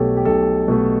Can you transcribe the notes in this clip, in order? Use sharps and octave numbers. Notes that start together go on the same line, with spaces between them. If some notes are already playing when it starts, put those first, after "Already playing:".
Already playing: B1 B2 A3 G4 A4 C#5
G4
B1 A4
B2 A3